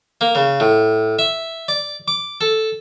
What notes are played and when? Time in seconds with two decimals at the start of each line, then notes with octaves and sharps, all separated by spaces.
0.21 A#3
0.35 C#3
0.60 A2
1.19 E5
1.68 D5
2.08 D6
2.41 A4